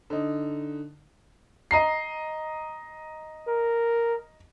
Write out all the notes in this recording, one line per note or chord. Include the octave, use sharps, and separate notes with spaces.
D3 D#4
D#5 A#5 C7
A#4